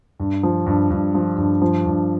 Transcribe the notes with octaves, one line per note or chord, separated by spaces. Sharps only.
G2
F3
G2
G2
F3
G2
F3
G2